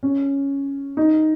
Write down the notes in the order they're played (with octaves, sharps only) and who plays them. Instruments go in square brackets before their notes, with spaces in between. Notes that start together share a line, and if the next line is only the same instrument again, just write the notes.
[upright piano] C#4
D#4